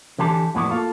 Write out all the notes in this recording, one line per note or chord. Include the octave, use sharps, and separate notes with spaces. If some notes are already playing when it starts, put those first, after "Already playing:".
D3 E3 D4 G4 A5
F2 A2 B3 E4 F#4 D5
A#3 F4 A4 F5